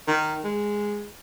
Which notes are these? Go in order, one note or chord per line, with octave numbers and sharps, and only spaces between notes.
D#3
G#3